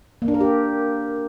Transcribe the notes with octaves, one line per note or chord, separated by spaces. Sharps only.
A#3
D4
A#4
G4